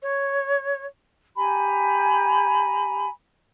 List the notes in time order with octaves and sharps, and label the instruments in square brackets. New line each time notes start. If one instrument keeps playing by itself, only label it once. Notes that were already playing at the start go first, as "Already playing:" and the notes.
[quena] C#5
[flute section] G4 G#5 A#5 B5